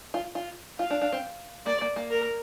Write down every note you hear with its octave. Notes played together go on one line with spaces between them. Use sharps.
F4
F4
F4 F5
D4
D4
C4
A#3 D5
A#3
A#3
A#4